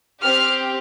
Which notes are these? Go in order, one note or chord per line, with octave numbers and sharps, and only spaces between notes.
C4 G4 F6